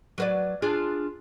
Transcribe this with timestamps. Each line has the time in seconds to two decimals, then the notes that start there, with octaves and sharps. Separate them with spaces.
0.18 F#3 B4 D5
0.62 D4 F4 G#4